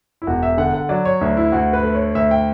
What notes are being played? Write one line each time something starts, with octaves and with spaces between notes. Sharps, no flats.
E4
E1 F#4
E5
D3 F#5
F#5
F#3 D5
C#5
D2 D4
E4
D2 F#4
B4
A3
C#5
D2 E5
G5